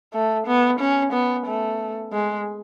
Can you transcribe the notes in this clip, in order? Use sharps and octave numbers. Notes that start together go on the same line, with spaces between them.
A3
B3
C#4
B3
A3
G#3